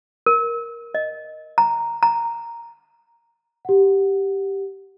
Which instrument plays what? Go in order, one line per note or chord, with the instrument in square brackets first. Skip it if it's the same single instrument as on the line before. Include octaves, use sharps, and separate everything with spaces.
[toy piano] A#4
D#5
A#5
A#5
[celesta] G4 F#5